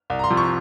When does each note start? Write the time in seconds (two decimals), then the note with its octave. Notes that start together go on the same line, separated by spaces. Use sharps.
0.10 C2
0.19 A#5
0.24 C6
0.30 C3 F3
0.37 C#6